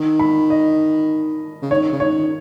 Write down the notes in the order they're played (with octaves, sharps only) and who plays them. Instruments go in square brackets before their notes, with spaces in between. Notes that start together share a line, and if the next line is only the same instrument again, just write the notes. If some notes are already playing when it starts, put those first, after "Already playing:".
Already playing: [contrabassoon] D#3
[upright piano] B5
D#5
[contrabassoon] C#3
[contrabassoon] D#3 [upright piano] C#5
[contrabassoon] C#3
[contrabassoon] D#3 [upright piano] C#5